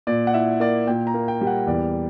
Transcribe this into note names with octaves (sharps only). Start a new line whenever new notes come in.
A#2 D5
F#5
E4 E5
A#3 D5
A#2 G5
A#5
A#3
G5
G3
F#5
E2 D5